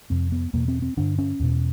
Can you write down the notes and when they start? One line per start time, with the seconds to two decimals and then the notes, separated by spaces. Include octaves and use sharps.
0.10 F2 C3 C4
0.32 B3
0.53 E2 B2 A#3
0.68 C4
0.82 C4
0.97 G2 D3 D4
1.18 C#4
1.40 E2 B2